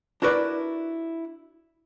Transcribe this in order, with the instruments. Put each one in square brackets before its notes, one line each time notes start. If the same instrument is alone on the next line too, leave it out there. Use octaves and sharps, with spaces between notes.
[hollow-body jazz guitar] D4 E4 F#4 A#4 B4 D5